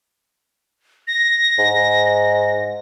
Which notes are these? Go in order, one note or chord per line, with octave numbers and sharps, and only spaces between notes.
A#6
G#2